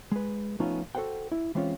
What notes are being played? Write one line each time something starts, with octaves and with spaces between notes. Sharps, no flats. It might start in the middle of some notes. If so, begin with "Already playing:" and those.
G#3 B4
F3 A3 B3 C#4 D#4 F4
F#4 A4 B4 C5 F#5 G5
E4
E3 G#3 C4 C#4 F4